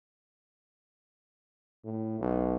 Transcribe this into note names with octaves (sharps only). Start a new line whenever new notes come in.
A2
B1